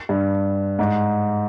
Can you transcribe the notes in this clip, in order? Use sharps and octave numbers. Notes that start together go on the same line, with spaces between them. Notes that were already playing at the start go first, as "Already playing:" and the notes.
G2
G#2